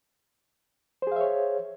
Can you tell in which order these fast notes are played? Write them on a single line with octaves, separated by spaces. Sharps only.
C5 G#4 F5 E5 C#5